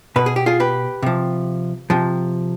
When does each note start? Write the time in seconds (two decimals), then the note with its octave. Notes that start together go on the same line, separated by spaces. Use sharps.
0.16 B2 B4
0.26 G#4
0.36 G4
0.46 F4 G#4
0.60 G4 B4
1.03 C3 F3
1.90 C3 F3